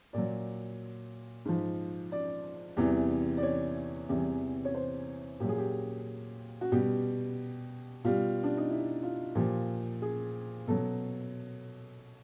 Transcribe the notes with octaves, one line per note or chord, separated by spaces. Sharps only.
A#2 F#3 D5
G#2 F3
D5
E2 C3 E3 G3
D5
C#5
E2 C3 E3 G3
C#5
C5
A#2 F#3 G4 G#4
G4
F#4
B2 G3 G4
B2 G3 F4
D4
D#4
E4
F4
A#2 F3 G4
G#4
B2 F#3 A4